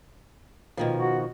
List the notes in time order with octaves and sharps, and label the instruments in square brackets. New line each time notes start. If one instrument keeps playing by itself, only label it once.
[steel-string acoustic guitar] B2 D#3 F3
[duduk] F#4